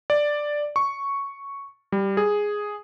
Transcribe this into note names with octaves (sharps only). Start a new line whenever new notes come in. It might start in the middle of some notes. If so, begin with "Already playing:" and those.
D5
C#6
G3
G#4